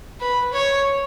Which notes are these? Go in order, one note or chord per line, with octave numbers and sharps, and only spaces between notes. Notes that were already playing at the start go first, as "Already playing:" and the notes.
B4
C#5